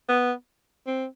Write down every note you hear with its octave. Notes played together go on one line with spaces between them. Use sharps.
B3
C4